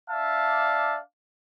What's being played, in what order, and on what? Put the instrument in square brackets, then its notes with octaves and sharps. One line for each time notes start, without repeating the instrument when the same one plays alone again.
[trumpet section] D4 D5 E5 F5 A5